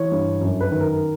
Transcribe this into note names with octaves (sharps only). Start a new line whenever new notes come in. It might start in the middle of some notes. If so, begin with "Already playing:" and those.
Already playing: E3 C#5
G2
F#2
B4
D#3
A#4